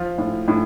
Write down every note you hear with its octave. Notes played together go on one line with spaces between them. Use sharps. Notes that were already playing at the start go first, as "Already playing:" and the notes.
Already playing: F3 F4
A2
A2